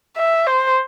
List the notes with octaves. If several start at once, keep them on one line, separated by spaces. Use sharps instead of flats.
E5
C5